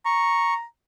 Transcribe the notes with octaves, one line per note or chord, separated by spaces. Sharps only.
A#5 C#6